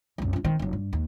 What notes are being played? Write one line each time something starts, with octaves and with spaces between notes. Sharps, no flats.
C2 F#2
C#4 F4
D#3 C4
F1 F#3
G2
D#2